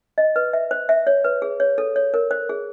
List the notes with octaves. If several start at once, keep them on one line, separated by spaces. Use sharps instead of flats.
D#5
B4
E5
C5
E5
C#5
B4
G#4
C#5
A4
C#5
A#4
C5
G#4